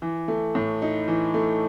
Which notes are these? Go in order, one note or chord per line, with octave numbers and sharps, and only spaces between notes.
E3
A3
A2
D#4
E3
A3